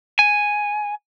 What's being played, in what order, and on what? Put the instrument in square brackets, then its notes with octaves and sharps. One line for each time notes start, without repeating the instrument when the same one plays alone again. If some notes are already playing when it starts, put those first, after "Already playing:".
[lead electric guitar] G#5